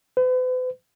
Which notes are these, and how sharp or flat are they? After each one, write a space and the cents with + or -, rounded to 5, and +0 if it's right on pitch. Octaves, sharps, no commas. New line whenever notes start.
B4 +45